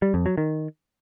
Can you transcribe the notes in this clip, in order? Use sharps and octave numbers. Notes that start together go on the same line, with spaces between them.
G3
F2
F#3
D#3